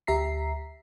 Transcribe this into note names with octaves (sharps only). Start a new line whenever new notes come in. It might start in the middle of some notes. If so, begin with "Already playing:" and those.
D2 G4 E5 A#5 B6 C7